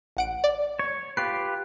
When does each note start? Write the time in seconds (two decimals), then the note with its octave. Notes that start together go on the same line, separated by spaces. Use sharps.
0.17 A1 F#5 D7
0.44 D5
0.79 C#5
1.17 F4 G4 B4 C7